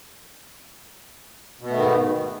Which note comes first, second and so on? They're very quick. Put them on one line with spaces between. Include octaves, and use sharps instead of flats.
B2 B3 A3 D#3 G#2